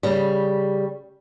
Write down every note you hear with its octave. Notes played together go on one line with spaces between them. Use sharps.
C#3 G3